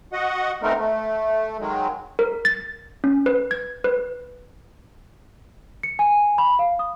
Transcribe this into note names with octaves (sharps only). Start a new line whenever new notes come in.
F#4 D#5 F#5
A3 B3 C4 D#4 A#4
A3
D#3 F#3 G#3
A#4
A6
C#4
B4
G#6
B4
C#7
G#5
B5
F5
D#6